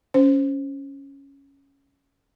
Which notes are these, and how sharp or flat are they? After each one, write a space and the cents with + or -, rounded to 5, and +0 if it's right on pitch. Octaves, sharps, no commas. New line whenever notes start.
C#4 +0 C5 +0